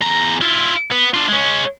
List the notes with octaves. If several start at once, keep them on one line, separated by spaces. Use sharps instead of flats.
E2 A#5
E4 F4
B3
D4 F4
G#3 C#4